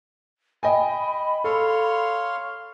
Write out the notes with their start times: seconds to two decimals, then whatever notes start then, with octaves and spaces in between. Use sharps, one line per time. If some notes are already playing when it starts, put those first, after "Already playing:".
0.63 D#5 G5 G#5 B5
1.44 A4 C#5 F5 C6